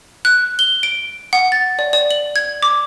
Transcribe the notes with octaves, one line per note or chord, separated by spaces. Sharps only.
F#6
G7
D7
F#5
A6
D5
D5
F#7
G#6
D6